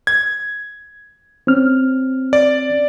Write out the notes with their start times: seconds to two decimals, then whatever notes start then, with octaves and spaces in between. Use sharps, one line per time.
0.07 G#6
1.47 C4 C#4 F6
2.33 D5